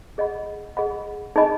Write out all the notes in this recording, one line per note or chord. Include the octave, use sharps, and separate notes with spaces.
G#4 D#5 F#5 B5
G#4 D#5 F#5 B5
D#4 G#4 D#5 G#5 B5